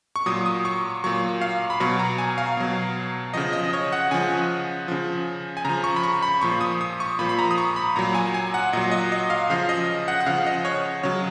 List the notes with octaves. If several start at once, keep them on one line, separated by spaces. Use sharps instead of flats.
C#6
A#2 F#3 D#6
D#6
C#6
A#2 F#3 C#6
F5
B5
B2 F#3 C#6
A#5
G#5
F5
B2 F#3
C#3 F3 D#5
D#5
C#5
F#5
C#3 F3 G#5
C#3 F3
G#5
C#3 F3 A#5
C#6
B5
C#6
B5
A#2 F3 C#6
D#6
D#6
C#6
A#2 F3 B5
B5
A#5
D#6
C#6
B5
A#2 F#3 A#5
G#5
G#5
F#5
A#2 F#3 D#5
D#5
D#5
F5
C#3 F3 F5
D#5
F#5
F#5
C#3 F3 F5
D#5
C#5
C#3 F#3 C#5